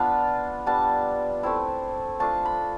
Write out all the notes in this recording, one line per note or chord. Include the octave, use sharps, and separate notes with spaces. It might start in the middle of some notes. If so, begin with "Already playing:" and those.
Already playing: B3 D4 F4 A5 B5
G3 B3 D4 A5
A3 C4 E4
A3 D4 F4 A5
B5